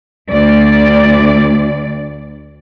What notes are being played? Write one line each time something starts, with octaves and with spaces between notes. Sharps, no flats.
D2 D5